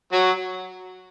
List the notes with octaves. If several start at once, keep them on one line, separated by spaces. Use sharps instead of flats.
F#3 F#4